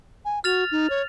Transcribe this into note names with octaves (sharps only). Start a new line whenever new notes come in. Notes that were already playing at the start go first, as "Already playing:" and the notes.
G#5
F#4 F6 A6 F7
D#4
C#5